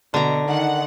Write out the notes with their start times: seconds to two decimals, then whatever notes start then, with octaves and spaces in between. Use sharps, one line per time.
0.14 B2 D3 A#5
0.49 D#3 F#5